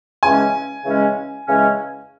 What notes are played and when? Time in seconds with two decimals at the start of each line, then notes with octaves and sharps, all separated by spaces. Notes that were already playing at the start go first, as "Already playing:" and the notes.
0.23 C#3 E3 G#3 C#4 G#5
0.85 C#3 E3 G#3 C#4
1.46 C#3 E3 G#3 C#4